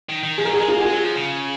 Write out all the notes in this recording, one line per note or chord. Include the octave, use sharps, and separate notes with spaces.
D#3
D#3
F3 G#4
A#4
F#3 G#4
G#3 A#4
A#3 F4 G#4
F#4
G#3 F4 G#4
F#3
F3
C#3